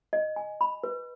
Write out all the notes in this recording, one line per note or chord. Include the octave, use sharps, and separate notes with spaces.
D#5
G#5
B5
B4